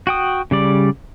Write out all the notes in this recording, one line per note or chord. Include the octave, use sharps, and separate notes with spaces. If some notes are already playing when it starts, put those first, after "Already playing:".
F#4 G5 D#6
C#3 G3 D5